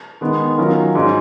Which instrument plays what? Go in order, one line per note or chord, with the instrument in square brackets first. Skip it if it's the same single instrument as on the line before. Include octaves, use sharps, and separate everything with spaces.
[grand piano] D#3 G#3 B3
D#3 F#3 C#4 F4 A#4
G#2 F#3 C#4